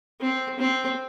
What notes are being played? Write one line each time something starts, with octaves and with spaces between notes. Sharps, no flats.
C4
C4